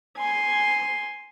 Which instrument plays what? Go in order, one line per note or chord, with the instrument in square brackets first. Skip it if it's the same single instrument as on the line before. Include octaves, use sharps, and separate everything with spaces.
[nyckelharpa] G#5 C6